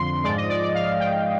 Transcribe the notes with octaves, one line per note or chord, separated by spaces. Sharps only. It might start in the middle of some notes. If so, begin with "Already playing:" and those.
Already playing: F2 D3 F3 C6
G#2 F3 G#3 D5
D#5
D5
D5
F5
G5